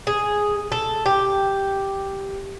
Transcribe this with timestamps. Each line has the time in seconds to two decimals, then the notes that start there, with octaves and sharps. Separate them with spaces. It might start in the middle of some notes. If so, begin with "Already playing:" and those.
0.07 G#4
0.72 A4
1.06 G4